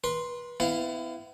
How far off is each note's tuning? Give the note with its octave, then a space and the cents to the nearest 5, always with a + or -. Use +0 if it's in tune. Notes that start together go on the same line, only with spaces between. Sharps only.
B4 -30 C6 +0
B3 +30 E4 +0 F5 -10